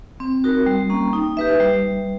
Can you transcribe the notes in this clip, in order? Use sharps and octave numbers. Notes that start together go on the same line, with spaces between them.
C4
D#4 F#4 A#4
G3
A#3 C#4
D#4
G4 B4 E5
G3